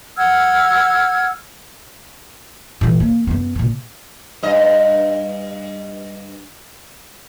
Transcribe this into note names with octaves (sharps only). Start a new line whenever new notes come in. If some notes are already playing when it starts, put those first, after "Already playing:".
F#5 E6 F6 G#6
A#2 E3
A#3
F#2 B3
A#2 C#3
G2 D#5